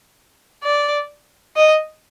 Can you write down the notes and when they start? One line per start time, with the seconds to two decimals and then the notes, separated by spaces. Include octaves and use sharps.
0.64 D5
1.57 D#5